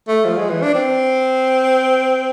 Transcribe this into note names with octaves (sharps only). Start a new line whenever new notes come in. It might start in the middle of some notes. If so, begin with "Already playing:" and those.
A3
F3
G#3
E3
D4
C4